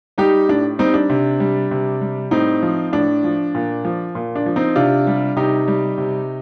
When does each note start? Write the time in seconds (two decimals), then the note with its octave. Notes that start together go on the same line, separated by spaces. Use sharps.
0.18 G3 D#4 G4
0.49 A2 D4
0.79 G3 C4 D#4
0.94 D4
1.10 C3
1.40 G3
1.71 C3
2.01 G3
2.31 A2 C4 D#4
2.63 F3
2.92 A2 D4
3.24 F3
3.55 A#2
3.85 F3
4.15 A#2
4.36 D4
4.46 F3
4.56 C4 D#4
4.76 C3 D4 F4
5.07 G3
5.37 C3 D#4 G4
5.68 G3
5.98 C3